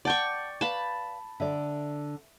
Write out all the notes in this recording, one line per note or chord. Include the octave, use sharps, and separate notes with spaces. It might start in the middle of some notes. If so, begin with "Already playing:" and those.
D5 F#5 G5 A5 C#6
B4 D5 F5 A5 B5
D3 D5 E5